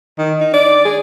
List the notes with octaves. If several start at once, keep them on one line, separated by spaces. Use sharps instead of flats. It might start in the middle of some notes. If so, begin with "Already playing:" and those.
D#3
D#4
D5
G#4